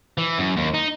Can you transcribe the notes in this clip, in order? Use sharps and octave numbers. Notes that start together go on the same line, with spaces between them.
E3
F#2
D#2
D#4